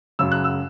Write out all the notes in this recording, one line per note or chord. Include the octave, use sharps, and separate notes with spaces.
F#2 C#3 F#3 E6
F#6
E6